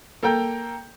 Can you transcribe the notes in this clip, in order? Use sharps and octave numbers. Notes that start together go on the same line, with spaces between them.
A#3 A4 A#4 G5 A#5 G6